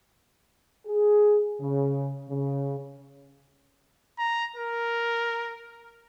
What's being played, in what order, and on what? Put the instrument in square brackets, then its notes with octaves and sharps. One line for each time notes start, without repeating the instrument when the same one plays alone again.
[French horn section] G#4
C#3
C#3
[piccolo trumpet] A#5
A#4